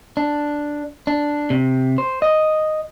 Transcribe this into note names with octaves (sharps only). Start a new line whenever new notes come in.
D4
D4
C3
C5
D#5